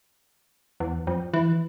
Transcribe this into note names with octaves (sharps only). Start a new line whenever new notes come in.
E2
F2
E3